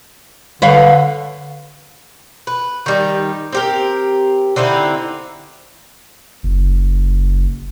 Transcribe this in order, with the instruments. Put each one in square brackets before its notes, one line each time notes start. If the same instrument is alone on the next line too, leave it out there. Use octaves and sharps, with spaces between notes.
[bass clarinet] D3 [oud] B4 C#5 F5
[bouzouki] B4
D#3 G3 D#4
C4 G4 A#4
D3 C4 D#4 E4
[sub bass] F#1